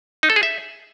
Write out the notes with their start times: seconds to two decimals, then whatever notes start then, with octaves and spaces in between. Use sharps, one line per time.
0.23 D#4
0.30 A4
0.36 G#4
0.43 E5